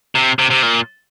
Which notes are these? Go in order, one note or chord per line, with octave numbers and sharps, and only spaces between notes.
C3
C3
C3
A#2